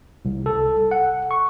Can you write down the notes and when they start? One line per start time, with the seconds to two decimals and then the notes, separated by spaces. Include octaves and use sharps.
0.25 C2
0.46 A4
0.91 F#5
1.31 C#6